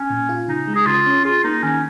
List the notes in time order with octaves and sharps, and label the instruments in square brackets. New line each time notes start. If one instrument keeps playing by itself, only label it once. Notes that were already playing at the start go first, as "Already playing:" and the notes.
Already playing: [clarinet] C#4
[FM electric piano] A#2
F4
[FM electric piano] C#3 [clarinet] D#4
[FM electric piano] G#3
[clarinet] G#4
[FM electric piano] C#3 [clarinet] F4
[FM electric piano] C#4
[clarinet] F4 [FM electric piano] G#4
[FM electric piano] A#3 [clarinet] D#4
[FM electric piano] D#3 [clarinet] C#4